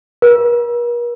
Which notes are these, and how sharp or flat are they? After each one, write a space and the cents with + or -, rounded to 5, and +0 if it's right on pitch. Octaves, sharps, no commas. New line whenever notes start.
A#4 +45